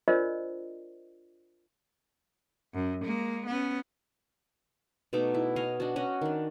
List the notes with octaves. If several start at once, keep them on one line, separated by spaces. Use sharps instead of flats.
D4 F4 A#4 C5 D5 D#5
F#2
G#3 A#3
B3 C#4
B2 A3 D#4 D6
E4
C#5 D#5 F5 G#5
D4 F#4
C#4 F#4 D#5
D#3 D4